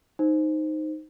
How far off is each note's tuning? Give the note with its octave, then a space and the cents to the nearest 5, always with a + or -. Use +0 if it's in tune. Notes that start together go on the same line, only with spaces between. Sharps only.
D#4 +0 C5 +0